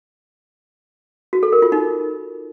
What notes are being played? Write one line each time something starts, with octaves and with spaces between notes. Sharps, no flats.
F#4
A4
A#4
F4
D#4